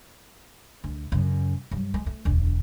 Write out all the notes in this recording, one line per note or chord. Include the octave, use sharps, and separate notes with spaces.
D2
F#2 C#3
G2 F#3
G#3
A3
E1 D2